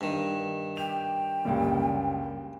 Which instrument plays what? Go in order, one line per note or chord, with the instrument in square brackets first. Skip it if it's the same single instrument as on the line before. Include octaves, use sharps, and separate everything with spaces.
[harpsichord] G2 D#3
[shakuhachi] G5 [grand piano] F7
[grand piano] C#2 F#2 [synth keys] G3 A#3